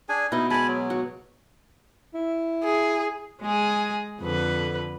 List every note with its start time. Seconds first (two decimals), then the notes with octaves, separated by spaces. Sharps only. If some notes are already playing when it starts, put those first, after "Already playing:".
0.09 D4 G#4 G#5
0.32 B2 D#4 E4 D#5
0.50 G#3 D5 G#5 A5 B5
0.68 F#3
0.90 F#4
2.14 E4
2.64 G#4
3.42 G#3 G#4
4.21 F2 D3 B4